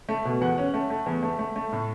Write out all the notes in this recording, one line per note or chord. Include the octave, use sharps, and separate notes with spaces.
A3
B2
E2 F#5
C#4
A3
A3
E2
A3
A3
A3
A2